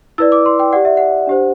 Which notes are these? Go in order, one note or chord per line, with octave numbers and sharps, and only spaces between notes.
E4 B4 D5 E6
D6
C6
G5
G4 D5 F#5
E5
F#5
D4 G4 C5